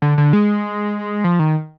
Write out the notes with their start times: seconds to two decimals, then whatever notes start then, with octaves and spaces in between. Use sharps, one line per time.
0.02 D3
0.18 D3
0.33 G#3
1.24 F3
1.39 D#3